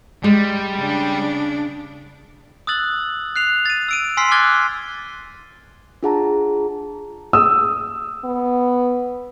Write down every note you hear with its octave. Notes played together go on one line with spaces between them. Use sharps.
G3 G#3
C#3 D4
D#6 E6 F#6 A6 F#7
F#6 C7 F7
A6 D#7
E6 D7 D#7
G#5 C6 E6 F6 B6 C7
D6 F6 F#6 G#6 A6 G7
D4 F4 G#4 F#5 A5 A#5
D#6 E6
B3